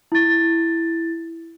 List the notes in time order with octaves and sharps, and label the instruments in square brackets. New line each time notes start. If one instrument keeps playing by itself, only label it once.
[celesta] E4 A6